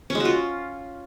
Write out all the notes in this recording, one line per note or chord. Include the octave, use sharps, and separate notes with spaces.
C#4
G#3
F#4
F4